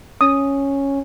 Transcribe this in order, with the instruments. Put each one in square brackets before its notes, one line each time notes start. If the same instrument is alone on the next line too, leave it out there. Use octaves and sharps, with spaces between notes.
[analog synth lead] C#4 [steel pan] D#6